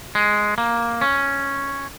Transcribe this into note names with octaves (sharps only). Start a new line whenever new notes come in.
G#3
A#3
C#4